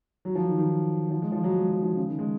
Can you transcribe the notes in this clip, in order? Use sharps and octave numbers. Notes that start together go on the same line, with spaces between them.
F#3
F3
D#3
D#3
F3
G#3
F3
F#3
G#3
F#3
F3
C#3
D#3
G#3